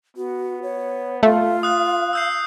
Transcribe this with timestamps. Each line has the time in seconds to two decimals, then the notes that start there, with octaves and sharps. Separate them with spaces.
0.17 B3 F#4
0.63 C#5
1.23 A3 F4 F5
1.63 D#6 F#6
2.13 E6 G6 C7